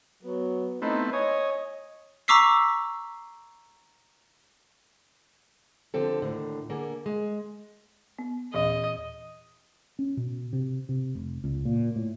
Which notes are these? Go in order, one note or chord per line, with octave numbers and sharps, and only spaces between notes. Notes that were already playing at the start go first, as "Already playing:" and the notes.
F#3 B3
A3 B3 C4 D#4 E4
C#5 D#5 G#5 D#6
A#5 C#6 D6 E6 B6 C7
D3 F3 C4 G4 A4
D#2 A2 D3
D3 A#3 G#4 A#4
G#3
B3
D#2 A#2 E3 D#5
C#4
B2
C3
C3
F1
C#2
A#2
A2